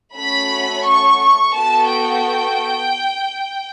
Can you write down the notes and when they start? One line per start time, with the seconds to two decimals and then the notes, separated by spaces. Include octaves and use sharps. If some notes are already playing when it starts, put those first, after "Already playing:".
0.14 A3 C#4 F#4 A4 B5
0.84 C#6
1.19 C#6
1.54 B3 F#4 A4 A5
1.89 G5